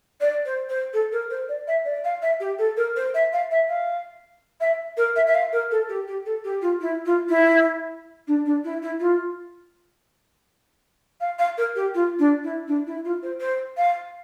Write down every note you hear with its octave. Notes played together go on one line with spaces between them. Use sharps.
D5
C5
C5
A4
A#4
C5
D5
E5
D5
F5
E5
G4
A4
A#4
C5
E5
F5
E5
F5
E5
A#4
E5
E5
F5
A#4
A4
G4
G4
A4
G4
F4
E4
F4
E4
D4
D4
E4
E4
F4
F5
F5
A#4
G4
F4
D4
E4
D4
E4
F4
C5
C5
F5